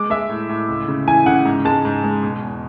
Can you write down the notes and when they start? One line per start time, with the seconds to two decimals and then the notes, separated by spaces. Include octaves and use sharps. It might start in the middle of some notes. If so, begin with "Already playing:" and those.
Already playing: G#3 D6
0.10 G#3 E5
0.29 A2
0.49 A2
0.69 C#2
0.88 C#3
1.07 E3 G#5
1.26 C#3 F#5
1.46 G#2
1.65 G#3 A5
1.85 G#2
2.04 G#3
2.23 B2
2.42 E2